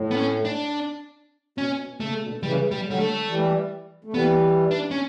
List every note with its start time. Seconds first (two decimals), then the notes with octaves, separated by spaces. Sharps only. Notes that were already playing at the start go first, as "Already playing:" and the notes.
Already playing: A2
0.11 B3
0.17 C#4
0.45 D4
1.58 B2 C#4
1.80 B2
2.00 C#3 A3
2.22 B2 D3
2.43 C#3 E3 G3
2.71 G3
2.86 D3 F#3 G3
3.00 A3
3.28 E3 G3
4.04 A3
4.14 E3 G3 B3
4.71 D4
4.91 C#4